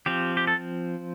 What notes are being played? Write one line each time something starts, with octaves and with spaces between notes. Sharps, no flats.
F3 C4 G4
G4
A4